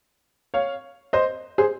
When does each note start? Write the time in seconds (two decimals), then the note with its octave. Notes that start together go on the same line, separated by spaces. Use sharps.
0.54 C#5 F5
1.13 C5 D#5
1.58 G#4 C5